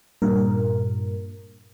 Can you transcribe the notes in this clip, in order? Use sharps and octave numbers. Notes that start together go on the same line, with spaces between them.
G2 A#2 A#4